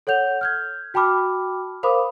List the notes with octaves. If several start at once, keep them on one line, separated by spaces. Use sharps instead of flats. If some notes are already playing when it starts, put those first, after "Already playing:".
A4 C#5 F#5 G6 F7
F6 G6 G#6
F#4 G5 A5 B5 D6 F6
A#4 C5 F5 B5 D6 D#6